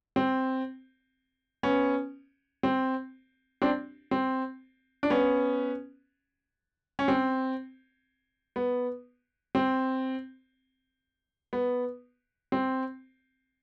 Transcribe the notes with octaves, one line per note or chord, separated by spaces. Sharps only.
C4
B3 C#4
C4
C4 D4
C4
D4
B3 C#4
C#4
C4
B3
C4
B3
C4